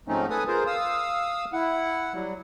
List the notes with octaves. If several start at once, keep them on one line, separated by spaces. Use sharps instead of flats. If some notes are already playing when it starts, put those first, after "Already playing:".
G#2 F3 A3 C4 C#4 D#4
A4 B4 G#5 D#6
F4 G#4 A#4 C5
F5 D#6 E6
E4 F#5
F#3 G3